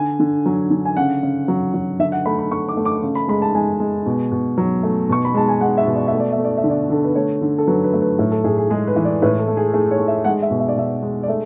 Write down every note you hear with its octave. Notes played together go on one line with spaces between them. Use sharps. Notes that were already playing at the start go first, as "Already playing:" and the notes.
Already playing: D3 G#5
D3
F#3
D3
G#5
C#3 F#5
C#3
F#3
F#3
D3 E5
F#5
A3 B5
B5
A3 C#6
D6
A3
D6
C#3
B5
G#3 B5
A5
G#3 G#5
G#3
B2
B2
F#3
A3
B2 C#6
B5
G#3 A5
G#5
G#3 F#5
E5
B2
D5
E5
A3
D5
E5
A3
D5
E5
D3
D5
D3 A4
B4
A3 C#5
D3
A4
F#3 B4
B4
A3
B4
A2
A4
A2 G#4
G#4
G#3 G#4
B4
E3
D5
A2 B4
A4
A3
G#4
A3 G#4
C#5
A3
E5
G#3 F#5
E5
B2
E5
D5
B2 E5
G#3
D5
A3 E5